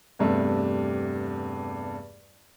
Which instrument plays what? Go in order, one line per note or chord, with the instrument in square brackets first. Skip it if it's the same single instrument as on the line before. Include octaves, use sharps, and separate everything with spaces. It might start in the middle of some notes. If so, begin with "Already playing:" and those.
[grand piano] E2 G2 C3 A3